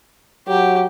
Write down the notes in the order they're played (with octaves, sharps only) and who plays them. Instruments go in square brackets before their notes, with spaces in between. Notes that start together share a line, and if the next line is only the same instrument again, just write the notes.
[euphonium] F#3 [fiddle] G4